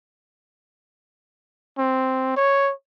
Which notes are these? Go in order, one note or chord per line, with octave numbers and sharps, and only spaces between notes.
C4
C#5